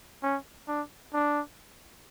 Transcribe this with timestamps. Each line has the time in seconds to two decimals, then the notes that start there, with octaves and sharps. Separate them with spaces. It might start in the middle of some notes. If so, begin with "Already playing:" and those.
0.23 C#4
0.68 D4
1.14 D4